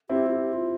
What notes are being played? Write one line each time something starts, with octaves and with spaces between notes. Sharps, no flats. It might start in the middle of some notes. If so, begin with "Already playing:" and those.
C4 E4 G4
F4
G4
F4